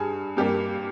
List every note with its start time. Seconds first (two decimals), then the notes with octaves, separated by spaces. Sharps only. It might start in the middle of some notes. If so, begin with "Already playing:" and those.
Already playing: G2 G#4
0.37 G2 G3 A#3 G4